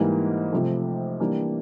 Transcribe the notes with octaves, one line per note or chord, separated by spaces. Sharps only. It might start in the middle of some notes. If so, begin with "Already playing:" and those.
Already playing: G#2 E3 G3 A#3
C3 F3 A3
E3 G3 A#3 D4